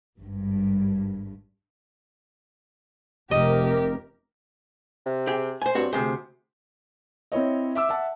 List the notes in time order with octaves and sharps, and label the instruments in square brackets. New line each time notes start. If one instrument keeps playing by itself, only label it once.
[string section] G#1 G2
[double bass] F1 [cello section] C3 A#4 [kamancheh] G4 [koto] D#5
[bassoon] C3
[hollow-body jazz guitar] G4 G#4
C5 G#5
[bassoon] G2 [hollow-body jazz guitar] C4 F#4 C#5
[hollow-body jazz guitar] D2 C3 C5 [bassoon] G#4
[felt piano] C4 E4 C#5 D#5
E5 D6 E6
E5 F#5 A5